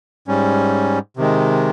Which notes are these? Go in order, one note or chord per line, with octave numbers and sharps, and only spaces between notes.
G#2 G3 C#4
C3 D#3 G#3